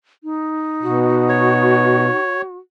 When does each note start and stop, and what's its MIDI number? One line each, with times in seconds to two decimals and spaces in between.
0.24 2.19 63
0.83 2.09 47
0.83 2.56 66
1.29 2.42 73